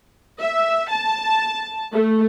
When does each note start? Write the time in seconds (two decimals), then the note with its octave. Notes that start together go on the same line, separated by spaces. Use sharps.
0.40 E5
0.91 A5
1.93 A3